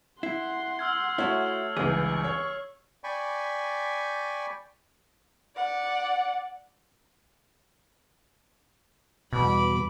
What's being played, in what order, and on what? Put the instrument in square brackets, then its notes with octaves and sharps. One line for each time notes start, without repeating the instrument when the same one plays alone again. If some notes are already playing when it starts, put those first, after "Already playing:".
[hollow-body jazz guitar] E4 [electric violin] F#5 C6 [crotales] C7
[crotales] E6 F6 G#6
[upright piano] A3 C#5 [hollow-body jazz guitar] E4 F#4
[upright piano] G1 C#2 E3 [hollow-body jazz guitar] G#4 [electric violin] C#6
[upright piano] C#5
[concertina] D5 G5 G#5 B5 C#6
[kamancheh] D5 F#5
[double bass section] E2 G3 [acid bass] B2 [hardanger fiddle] B5 D6